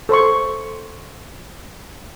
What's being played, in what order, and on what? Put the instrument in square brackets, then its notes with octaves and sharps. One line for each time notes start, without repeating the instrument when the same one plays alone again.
[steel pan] A4 C5 C6 C#6